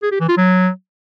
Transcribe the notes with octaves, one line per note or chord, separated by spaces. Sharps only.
G#4
G4
E3
F4
F#3